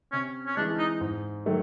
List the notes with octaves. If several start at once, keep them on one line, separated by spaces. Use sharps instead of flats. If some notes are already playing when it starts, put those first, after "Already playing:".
C3 C#4
C#4
E3 G#3 D4
D#4
G#2
D#3 F#3 A3